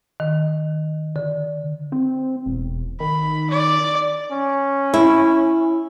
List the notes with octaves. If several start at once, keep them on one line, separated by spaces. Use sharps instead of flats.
D#3
D3
C4
E1
D#3 B5
D5
C#4
E4